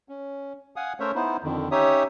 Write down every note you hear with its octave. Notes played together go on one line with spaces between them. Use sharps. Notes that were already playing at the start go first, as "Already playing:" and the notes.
C#4
F5 F#5 G#5 D#6
A3 C#4 A#4 C5 C#5 E5
B3 D#4 E4 C5
F2 D3 D#3
C#4 D#4 G4 C#5 E5 D#6